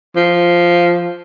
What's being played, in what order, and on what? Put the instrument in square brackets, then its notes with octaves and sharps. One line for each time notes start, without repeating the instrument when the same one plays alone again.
[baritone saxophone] F3